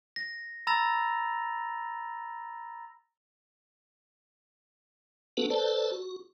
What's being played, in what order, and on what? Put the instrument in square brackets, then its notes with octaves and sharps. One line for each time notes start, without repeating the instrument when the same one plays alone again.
[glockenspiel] A#6
A#5 B5 E6 A6 A#6 F7
[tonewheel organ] A#3 B3 D4 F#4 A4 B4
A4 B4 C5 D5 A5
F#4